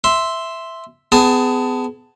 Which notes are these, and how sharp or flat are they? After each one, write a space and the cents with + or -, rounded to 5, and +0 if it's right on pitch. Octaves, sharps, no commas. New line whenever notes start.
E5 +0 C6 +0
B3 +35 G#4 +0 A5 +10